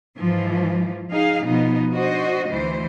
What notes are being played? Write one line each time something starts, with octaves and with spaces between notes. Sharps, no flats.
G#2 E3 F3
D#4 G#4 F5
B2 F3 B3 D#4
D4 F#4 C5 D#5
D2 E3 C5